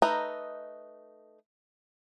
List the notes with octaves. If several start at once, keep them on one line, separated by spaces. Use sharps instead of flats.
A3 D#4 B4 D#5 A#5